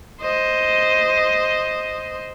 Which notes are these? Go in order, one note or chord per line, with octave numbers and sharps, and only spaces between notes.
C5 D#5